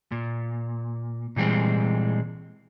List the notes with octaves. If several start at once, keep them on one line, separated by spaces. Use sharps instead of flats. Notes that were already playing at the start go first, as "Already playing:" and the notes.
A#2
A#2 E3 G3 G#3 C4